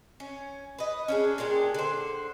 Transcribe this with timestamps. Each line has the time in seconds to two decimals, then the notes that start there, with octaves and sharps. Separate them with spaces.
0.20 C#4
0.78 B4 D#5
1.08 C#4 D4 G#4
1.38 A#2 G#3 D4 G4
1.74 D3 C5